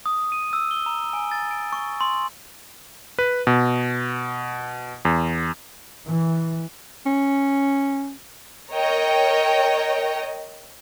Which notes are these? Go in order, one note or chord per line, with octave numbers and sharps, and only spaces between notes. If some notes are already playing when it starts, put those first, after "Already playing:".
D#6
D#7
E6
G7
A#5
G#5
A6
D7
C#6
C6
B4
B2
E2
E3
C#4
A#4 C#5 D#5 G5